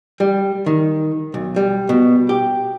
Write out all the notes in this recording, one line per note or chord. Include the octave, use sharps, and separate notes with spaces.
G3
D#3
B1
G3
B2
G4